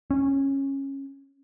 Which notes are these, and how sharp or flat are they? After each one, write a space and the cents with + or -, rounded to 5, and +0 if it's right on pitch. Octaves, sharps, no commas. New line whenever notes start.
C#4 -15